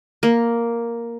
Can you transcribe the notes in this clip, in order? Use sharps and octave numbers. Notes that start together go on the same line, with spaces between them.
A#3